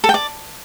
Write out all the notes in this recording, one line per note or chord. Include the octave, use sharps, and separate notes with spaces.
A4
G5
D5